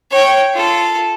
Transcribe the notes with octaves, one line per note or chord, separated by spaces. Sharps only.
C#5 G5
F4 A4